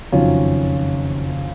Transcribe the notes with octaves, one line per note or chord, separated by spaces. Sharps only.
F#1 F2 D#3 F#3 C#4 F4